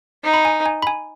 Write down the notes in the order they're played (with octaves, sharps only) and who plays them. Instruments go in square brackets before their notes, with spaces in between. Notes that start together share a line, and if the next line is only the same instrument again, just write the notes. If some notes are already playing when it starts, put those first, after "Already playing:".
[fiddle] D#4
[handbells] B5
G#5
G#5
B5
G#5